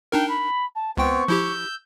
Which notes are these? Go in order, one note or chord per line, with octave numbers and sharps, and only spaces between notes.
D4 D#4 A#4 G5
B5
A5
C#2 B3 C4 G5 C#6
F3 E4 G4 E6 G6